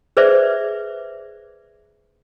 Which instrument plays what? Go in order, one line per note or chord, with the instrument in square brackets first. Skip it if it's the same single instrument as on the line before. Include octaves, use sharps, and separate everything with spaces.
[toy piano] G#4 B4 C5 D5 E5